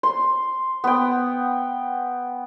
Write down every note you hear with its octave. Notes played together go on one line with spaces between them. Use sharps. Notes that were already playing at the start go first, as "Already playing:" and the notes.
C6
B3 G5